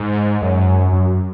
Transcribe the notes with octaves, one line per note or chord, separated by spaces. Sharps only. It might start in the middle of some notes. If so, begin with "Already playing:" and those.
Already playing: G#2
F#2
F#2